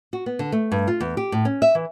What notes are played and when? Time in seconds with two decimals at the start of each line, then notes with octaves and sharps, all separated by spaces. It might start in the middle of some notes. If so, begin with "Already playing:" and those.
0.13 F#4
0.26 B3
0.39 D3
0.52 A3
0.72 G2
0.87 F4
1.00 E2
1.17 G4
1.32 A2
1.45 C#4
1.62 E5
1.75 E3